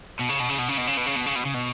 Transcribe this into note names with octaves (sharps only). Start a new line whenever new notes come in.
B2
C#3
B2
C#3
B2
C#3
B2
C#3
B2
C#3
B2
C#3
B2
C#3
B2